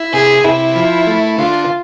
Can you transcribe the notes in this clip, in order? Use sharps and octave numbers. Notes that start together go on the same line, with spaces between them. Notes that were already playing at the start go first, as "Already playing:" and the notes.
Already playing: E4
C3 G#4
C3 E4
F3
A3
D3 F4